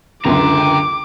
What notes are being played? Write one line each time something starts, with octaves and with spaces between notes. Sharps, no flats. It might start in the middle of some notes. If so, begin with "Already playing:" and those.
C#2 F#2 D3 G5 A#5 C6 D6